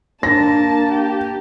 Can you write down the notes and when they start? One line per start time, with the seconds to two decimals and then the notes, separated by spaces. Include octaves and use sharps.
0.23 A#3 D4 A5 A#6
0.91 G4